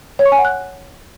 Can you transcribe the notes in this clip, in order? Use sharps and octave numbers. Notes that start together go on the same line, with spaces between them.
C#5
C#6
G#5
F#5
F#6